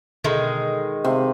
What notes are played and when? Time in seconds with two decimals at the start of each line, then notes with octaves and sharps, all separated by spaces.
0.24 B2 D3 D#3 G#3 D#4 A4
1.04 C3 F5